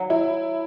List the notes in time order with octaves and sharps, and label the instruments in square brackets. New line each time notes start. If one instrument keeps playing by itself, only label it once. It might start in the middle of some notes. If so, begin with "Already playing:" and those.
Already playing: [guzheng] F#3
[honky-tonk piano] E4